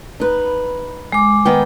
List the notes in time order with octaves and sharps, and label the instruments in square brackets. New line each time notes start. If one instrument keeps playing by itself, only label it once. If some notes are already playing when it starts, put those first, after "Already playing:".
[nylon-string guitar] D#4 B4
[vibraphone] G#3 D6
[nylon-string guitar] D#3 B3 G5